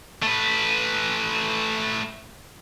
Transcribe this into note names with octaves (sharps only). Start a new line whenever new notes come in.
A3 B4